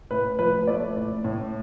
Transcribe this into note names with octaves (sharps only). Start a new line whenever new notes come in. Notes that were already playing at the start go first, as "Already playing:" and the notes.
A2 B4
F3 B4
A3 D5
A2
A2